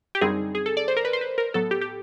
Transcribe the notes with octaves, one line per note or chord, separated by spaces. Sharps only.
G4
F#2 D3 G3 C4 D#4 G#4
G#4
A4
D5
C5
A#4
B4
C5
B4
A#4
A2 F#3 B3 A4
G4
G4